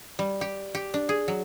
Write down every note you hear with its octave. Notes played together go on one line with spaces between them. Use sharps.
G3
G4
G4
D4
G#4
F#3